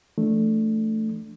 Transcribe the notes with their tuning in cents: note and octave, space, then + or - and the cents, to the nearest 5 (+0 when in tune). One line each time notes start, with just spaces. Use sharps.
F3 -45 A3 +0 D4 +0